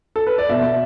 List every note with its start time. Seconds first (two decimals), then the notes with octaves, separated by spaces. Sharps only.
0.16 A4
0.27 B4
0.38 D5
0.49 B2 E5